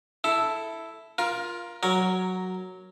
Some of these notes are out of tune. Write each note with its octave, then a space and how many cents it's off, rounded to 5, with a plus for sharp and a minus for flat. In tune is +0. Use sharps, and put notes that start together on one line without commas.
E4 +0 A4 +0
F4 +0 A#4 +20
F#3 +0 A#4 +0 C#5 +0